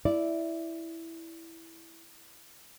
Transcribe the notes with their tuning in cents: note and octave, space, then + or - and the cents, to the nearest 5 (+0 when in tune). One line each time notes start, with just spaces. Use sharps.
E4 +0 D5 +0